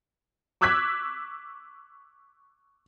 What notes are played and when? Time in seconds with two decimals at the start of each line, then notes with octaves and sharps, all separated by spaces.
0.61 C#6 D6 E6 F#6 G#6 B6